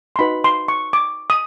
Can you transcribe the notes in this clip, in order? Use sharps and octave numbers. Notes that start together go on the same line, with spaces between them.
C6
D#4 F#4 B4 B5
C6
C#6
D6
D#6